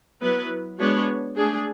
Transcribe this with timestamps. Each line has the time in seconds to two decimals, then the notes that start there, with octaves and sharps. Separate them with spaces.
0.22 F#3 B3 E4 B4
0.79 G#3 B3 D4 F#4 C#5
1.36 A3 D4 G#4